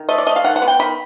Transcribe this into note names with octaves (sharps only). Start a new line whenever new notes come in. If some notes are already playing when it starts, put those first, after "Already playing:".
Already playing: D#3
A3 D#5
D5
A3 D#5
F5
D#3 F#5
F#5
B3
G5
D#3 B5